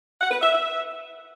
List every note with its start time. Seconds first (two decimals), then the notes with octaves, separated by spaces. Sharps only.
0.20 F#5
0.31 B4
0.41 E5
0.52 E5